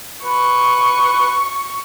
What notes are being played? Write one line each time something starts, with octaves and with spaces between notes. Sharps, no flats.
B4 C#6